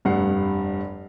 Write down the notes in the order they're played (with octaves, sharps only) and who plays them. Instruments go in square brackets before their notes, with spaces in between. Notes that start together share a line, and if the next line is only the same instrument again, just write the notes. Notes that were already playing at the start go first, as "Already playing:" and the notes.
[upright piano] F1 G2 G3 F#5 C7